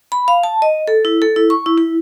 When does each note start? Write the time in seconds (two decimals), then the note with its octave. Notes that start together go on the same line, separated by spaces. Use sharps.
0.12 B5
0.28 F5
0.43 A5
0.62 D#5
0.87 A4
1.05 E4
1.22 A4
1.36 E4
1.50 C#6
1.66 E4
1.78 E4